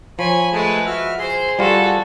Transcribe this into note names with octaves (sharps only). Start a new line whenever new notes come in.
F3 C#5 G#5 B5
G#3 A3 G#4 B4 A5
F#4 E5 F6
G#4 C5 C6
G3 F4 F#4 A4